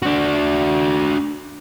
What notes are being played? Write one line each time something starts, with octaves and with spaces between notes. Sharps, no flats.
D4 F#4